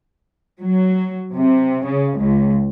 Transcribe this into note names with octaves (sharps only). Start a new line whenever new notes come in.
F#3
C3
C#3
C#2